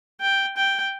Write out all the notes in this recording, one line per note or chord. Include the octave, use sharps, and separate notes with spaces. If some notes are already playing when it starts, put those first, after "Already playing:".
G5
G5